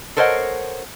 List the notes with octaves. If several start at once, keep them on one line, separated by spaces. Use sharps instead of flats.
A4 A#4 C5 C#5 D#5 F#5